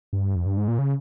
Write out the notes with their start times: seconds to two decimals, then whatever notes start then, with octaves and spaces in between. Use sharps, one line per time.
0.13 G2
0.36 F2
0.46 G2
0.57 G#2
0.68 A#2
0.79 C#3